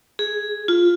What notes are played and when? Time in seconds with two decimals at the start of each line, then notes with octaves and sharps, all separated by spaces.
0.19 G#4
0.68 F4